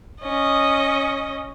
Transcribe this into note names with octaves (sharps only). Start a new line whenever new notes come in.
C#4 D#5